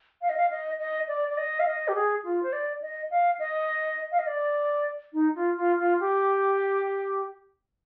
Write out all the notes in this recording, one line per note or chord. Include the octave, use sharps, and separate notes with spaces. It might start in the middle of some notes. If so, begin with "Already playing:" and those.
F5
D#5
F5
D#5
D#5
D5
D5
D#5
F5
D#5
G4
G#4
F4
C5
D5
D#5
F5
D#5
F5
D#5
D5
D#4
F4
F4
F4
G4